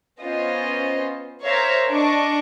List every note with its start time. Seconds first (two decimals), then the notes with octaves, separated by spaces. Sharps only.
0.23 B3 C#4 F4 C5 D#5
1.43 A#4 C5 C#5 E5 F5 A#5
1.90 D4 D#5 C#6 D6